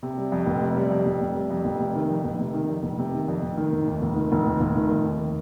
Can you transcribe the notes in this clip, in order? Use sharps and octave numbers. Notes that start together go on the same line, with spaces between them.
C3
G3
F2
F1
C3
G3
F2
F1
C3
G3
F2
F1
C3
D#3
F2
F1
C3
D#3
F2
F1
C3
D#3
F2
F1
D#3
F1
D#2
F1
D#3
F1
D#2
F1
D#3
F1
D#2